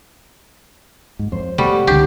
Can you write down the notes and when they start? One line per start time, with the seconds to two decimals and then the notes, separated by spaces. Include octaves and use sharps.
1.19 G#2
1.32 F2 C5 C6
1.58 B2 G3 A3 F#5 B5 C#6
1.87 F1 C#2 D3 G3 G4